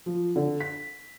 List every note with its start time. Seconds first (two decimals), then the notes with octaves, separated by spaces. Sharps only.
0.06 F3
0.36 D3
0.60 B6